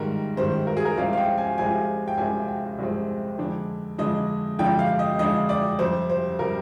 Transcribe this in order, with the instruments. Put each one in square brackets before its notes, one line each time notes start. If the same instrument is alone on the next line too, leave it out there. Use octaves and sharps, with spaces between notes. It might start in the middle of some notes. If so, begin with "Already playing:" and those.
Already playing: [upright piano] G#2 D#3 G3 A#4
G#2 D#3 G3 C5
A#4
G#4
A#4
C2 C3 F3 G#3 C4 F5
F5
G5
G#5
C2 C3 F3 G#3 C4 G#5
G5
C2 C3 F3 G#3 C4 G#5
G5
C2 C3 F3 G#3 C4
F2 D3 G#3 D4
F2 D3 G#3 D4 D#5
F2 D3 G#3 D4 G5
F5
D#5
F2 D3 G#3 D4 D#5
D5
F2 C3 G3 C5
C5
C3 G3 A#4